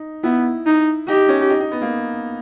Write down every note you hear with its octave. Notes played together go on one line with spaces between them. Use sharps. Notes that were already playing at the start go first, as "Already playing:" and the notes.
Already playing: D#4
B3 E4
D#4
D#4 G4
C#4
D#4
D#4
B3
A#3